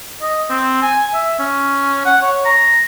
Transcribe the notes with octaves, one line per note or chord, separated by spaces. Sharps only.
D#5
C4
G#5
E5
C#4
F#5
C#5
A#5